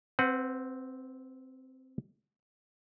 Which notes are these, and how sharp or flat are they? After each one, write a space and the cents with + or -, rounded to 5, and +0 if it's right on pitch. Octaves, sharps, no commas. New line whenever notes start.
C4 +0 B4 +35 F#5 +0